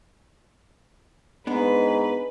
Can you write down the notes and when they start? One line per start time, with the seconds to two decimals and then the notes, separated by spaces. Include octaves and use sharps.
1.47 G#2 B3 D4 D#4 B4